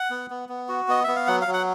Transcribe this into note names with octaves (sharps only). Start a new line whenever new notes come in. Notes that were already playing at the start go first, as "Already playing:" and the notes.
Already playing: F#5
B3
B3
B3
F#4
B3 D#5
B3 E5
F5
F#3 F#5
F5
F#3
F#5